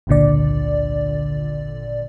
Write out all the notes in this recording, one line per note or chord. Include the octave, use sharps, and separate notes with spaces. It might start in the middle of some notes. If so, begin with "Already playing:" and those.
G#1 C#2 A#2 D3 D5